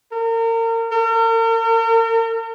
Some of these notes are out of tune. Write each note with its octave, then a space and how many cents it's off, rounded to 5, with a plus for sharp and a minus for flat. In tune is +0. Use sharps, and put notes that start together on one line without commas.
A#4 -35
A#4 -40